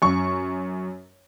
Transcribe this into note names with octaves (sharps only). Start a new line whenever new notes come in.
F#2 C#6